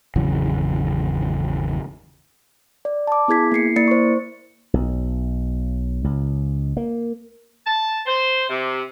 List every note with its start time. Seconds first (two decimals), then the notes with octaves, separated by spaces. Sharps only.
0.16 G#1 E2 C#3 F#3
2.85 D5
3.07 A5 D6
3.28 B3 E4 G#4 G#6 B6
3.52 A#3 E4 C7 C#7
3.76 A#3 E4 D5 A6 C#7
3.88 C5 C#6
4.74 B1
6.04 C#2
6.77 A#3
7.66 A5
8.06 C5
8.49 C3